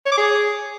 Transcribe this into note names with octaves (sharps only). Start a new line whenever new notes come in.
C#5
D6
G#4